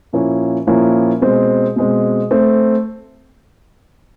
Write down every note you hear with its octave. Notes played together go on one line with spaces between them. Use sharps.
A#2 F3 A#3 C#4 E4
A#2 F3 A#3 C#4 E4
B2 G#3 C4
B2 G#3 C4
A3 C4